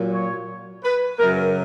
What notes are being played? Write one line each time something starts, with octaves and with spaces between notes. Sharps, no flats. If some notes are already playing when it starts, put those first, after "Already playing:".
Already playing: A#2 F#3
C#5
B4
F#2 C#3 F#3 A#4